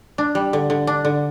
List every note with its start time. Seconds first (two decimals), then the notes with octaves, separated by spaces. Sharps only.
0.18 D4
0.35 G3
0.53 D3
0.70 D3
0.87 D4
1.05 D3